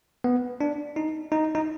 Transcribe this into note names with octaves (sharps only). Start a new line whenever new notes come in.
B3
D4
D#4
D#4
D#4